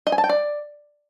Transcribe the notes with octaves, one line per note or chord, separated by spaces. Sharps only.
D#5
G#5
A5
G5
D5